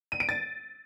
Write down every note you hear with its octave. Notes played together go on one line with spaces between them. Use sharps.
D#7
D7
A6